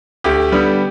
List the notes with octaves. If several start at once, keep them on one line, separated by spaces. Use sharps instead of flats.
D2 G4
D3 G3 B3